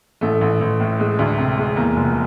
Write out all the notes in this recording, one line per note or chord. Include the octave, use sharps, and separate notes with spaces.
A1 A3
A1
A1
A2
G#3
D2
C3
G#3
E2 A#3
F1